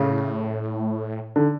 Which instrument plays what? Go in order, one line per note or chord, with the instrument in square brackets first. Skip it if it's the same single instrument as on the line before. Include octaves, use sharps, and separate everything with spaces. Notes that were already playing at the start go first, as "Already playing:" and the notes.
Already playing: [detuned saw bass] A2 [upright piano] C#3
[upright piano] D3